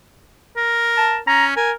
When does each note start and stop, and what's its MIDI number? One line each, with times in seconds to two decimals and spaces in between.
0.57 1.19 70
0.97 1.17 81
1.27 1.56 61
1.27 1.46 82
1.57 1.73 70
1.57 1.71 80